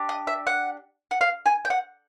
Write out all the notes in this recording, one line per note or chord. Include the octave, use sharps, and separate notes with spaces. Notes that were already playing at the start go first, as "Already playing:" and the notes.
Already playing: D4 G4
D#5
E5
F#5
F#5
F5
G#5
G5
F#5